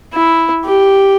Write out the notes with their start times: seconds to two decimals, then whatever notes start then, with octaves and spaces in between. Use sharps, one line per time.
0.13 E4
0.66 G4